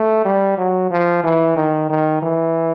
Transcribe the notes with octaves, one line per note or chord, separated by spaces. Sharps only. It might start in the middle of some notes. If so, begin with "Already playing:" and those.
Already playing: A3
G3
F#3
F3
E3
D#3
D#3
E3